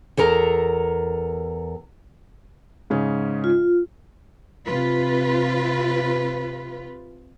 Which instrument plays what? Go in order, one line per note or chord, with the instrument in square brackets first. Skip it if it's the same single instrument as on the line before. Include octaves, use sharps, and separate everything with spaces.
[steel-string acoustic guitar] E2 A4 A#4 A#5
[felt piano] G#2 C#3 C#4
[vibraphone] F4
[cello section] C3 F4 B4